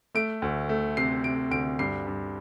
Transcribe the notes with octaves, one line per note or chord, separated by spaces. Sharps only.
A3 D7
D2
A3
C3 C7
C3 D7
D2 D7
G2 C7
G2